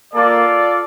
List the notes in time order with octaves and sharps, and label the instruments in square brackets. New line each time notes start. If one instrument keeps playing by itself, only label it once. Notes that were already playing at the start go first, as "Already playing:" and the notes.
[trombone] A#3 [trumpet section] F4 A4 D5